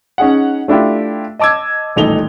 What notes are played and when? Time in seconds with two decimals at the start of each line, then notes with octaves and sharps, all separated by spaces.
0.18 C#4 D#4 G#4 F#5
0.68 A3 D4 E4 F4 G4
1.39 D#5 A5 D6 E6 G#6
1.96 D#1 A1 D#4 A4 F7 G7